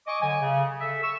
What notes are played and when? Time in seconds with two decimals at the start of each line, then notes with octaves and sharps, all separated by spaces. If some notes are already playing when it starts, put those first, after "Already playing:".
0.07 D#5 G#5 C#6 D6
0.22 D3 F#3 D#5 G#5
0.42 C#3
0.80 A4 E5
1.03 C#6 E6